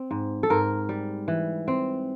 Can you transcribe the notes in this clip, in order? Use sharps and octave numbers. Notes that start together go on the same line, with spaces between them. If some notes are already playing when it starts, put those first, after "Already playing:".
Already playing: C4
G#2
A4
G#2 A#4
G3
E3
C4